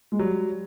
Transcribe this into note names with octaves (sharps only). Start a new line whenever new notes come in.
G#3
F#3 G3